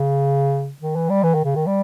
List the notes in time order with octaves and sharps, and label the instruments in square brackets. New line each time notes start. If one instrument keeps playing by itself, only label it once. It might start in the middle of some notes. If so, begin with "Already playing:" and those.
Already playing: [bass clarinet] C#3
D#3
E3
G3
E3
D#3
C#3
D#3
G3